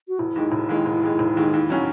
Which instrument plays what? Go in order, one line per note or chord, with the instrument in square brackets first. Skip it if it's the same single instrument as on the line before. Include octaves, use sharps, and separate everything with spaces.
[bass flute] F#4
[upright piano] E1 [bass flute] E4
[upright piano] D#2 D#3 G#3
E1
D#2 D#3 G#3
E1
D#2 D#3 G#3
E1
D#2 D#3 G#3
[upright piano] D#2 [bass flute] E4
[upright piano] D#3 F#3 C#4